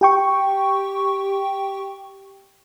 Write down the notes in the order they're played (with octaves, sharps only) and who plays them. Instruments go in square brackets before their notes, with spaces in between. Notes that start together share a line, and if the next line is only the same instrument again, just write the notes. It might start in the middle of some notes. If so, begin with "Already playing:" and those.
[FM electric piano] G4 G5 C#6